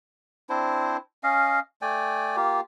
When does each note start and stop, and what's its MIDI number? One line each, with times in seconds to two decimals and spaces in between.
0.49 0.97 60
0.49 0.97 62
0.49 0.97 64
0.49 0.97 72
1.23 1.60 61
1.23 1.60 75
1.23 1.60 77
1.82 2.36 57
1.82 2.36 74
1.82 2.36 79
1.82 2.36 80
2.36 2.61 58
2.36 2.61 65
2.36 2.61 67